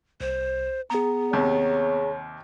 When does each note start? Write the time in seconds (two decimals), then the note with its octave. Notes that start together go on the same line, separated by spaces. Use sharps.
0.21 C2 C5
0.90 B3 G#4 A#5
1.33 D#2 C3 C#5